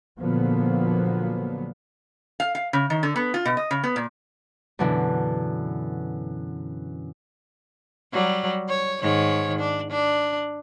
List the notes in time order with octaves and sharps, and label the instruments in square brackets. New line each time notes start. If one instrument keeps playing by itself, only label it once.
[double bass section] A#2 D3 F3 F#3 A#3 B3
[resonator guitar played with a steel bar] F5
F5
C#3
D#3
D3
B3
F4
B2
D#5
C#3
B3
A#2
[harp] F#2 B2 D3 E3
[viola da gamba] F#3 G3
C#5
G#2 D#3 C#5
D4
D4